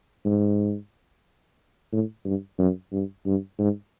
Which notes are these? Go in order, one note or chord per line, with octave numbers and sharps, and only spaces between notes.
G#2
A2
G2
F#2
G2
G2
G#2